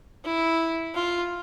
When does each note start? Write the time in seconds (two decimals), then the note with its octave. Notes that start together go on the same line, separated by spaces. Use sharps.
0.25 E4
0.95 F4